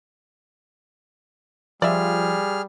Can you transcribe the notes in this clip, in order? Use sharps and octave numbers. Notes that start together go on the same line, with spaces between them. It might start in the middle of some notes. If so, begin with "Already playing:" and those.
F3 G3 G#4 D5 E5 F6